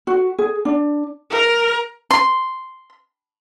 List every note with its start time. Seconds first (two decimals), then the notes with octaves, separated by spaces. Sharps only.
0.07 F#4
0.38 G#4
0.65 D4
1.30 A#4
2.11 C6